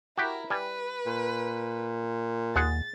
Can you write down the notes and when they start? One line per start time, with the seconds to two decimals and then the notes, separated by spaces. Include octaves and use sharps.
0.18 E4 F#4 G4 A#4
0.50 G3 B4 G#5
1.07 A#2
2.56 D#2 G#3 G#4 F#5 A6